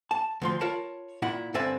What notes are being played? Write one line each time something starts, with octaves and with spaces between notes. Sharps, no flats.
A5
D2 F3 C6
F4 A#4 C#5 A5 B5
A#2 E4 F#5 B5
G2 D3 C4 D5 E5 G#5